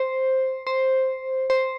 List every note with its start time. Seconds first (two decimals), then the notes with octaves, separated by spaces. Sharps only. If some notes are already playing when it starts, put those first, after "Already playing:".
Already playing: C5
0.67 C5
1.50 C5